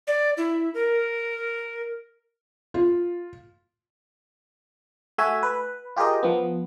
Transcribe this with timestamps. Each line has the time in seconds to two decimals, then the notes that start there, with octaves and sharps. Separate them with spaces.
0.07 D5
0.37 E4
0.74 A#4
2.74 F4
5.18 A3 F#4 E5 G#5
5.43 B4
5.96 F4 G4 G#4 A#4 D#5
6.23 F3 B3